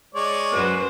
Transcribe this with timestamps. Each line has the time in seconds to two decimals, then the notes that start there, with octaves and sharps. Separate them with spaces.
0.15 G#3 C#5 D5
0.53 F#2 F#4 B4 C5